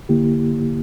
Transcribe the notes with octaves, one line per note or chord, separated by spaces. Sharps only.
D3 A#3 E4 G4